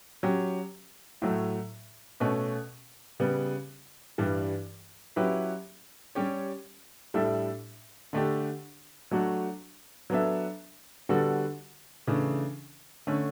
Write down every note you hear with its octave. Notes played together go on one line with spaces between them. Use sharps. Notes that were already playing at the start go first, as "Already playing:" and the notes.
F#3 C#4 G4
A2 F#3 A3
B2 A3 C#4
C#3 G3 B3
G2 E3 G3
F#3 C#4 E4 G4 B4
G3 C#4 G4 C#5
A2 G3 D4 A4 E5
D3 A3 D4 G4
F#3 A3 D4 F#4
F#3 B3 D4 A4 E5
D3 G3 B3 F#4 A4
C#3 E3 A3 D4
D3 A3 C#4